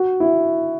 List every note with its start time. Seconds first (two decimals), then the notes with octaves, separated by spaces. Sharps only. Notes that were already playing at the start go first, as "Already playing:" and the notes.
Already playing: F#4
0.20 E4